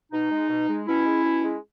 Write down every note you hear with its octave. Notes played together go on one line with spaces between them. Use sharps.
B2 D#4
G#3
B2
G#3
B2 C#4 E4
G#3
B2
G#3